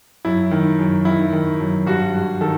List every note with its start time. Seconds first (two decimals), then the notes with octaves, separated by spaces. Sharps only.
0.25 F#2 E4
0.51 D#3
0.79 F#2
1.05 D#3 E4
1.33 D#3
1.60 F#2
1.86 G2 F#4
2.14 G2
2.41 D#3 A4